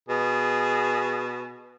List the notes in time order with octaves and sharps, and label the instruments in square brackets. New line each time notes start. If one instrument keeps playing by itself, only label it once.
[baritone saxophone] B2 [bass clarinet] G#4